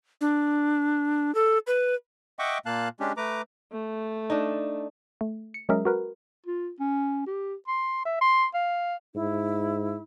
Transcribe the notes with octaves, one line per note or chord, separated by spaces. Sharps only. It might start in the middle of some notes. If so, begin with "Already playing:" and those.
D4
A4
B4
D#5 E5 F#5 G5 C#6 D6
A#2 A#3 F5 A5 F#6
G#3 C#4 D4 G4
A3 B4 A#5 D6
A3
D4 D#4
A3
C#7
F#3 G#3 C#4 G#4 A#4 E5
F#4 A#4 B4
F4
C#4
G4
C6
E5
C6
F5
G#2 E4